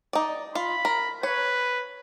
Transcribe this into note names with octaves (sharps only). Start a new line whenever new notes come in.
D#4 D5
F4 B5
A#4
B4 C#5